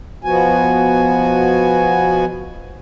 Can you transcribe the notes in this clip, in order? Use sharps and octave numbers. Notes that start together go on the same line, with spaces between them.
B2 F3 B3 F#4 G#5